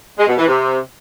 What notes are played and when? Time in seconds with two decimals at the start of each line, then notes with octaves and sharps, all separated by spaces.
0.17 G#3
0.27 B2
0.37 E3
0.47 C3